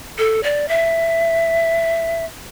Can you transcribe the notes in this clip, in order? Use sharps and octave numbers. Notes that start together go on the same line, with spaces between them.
A4
D5
E5